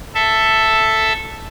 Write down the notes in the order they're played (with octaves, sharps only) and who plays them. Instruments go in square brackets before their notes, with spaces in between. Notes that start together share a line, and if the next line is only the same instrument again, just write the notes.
[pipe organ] A4 E5